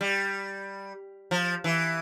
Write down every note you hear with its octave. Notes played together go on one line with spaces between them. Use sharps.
G3
F3
E3